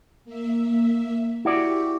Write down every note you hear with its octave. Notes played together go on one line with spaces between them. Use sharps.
A#3 E5
E4 F#4 G4 D5